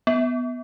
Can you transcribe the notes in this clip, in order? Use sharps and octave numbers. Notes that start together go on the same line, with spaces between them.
B3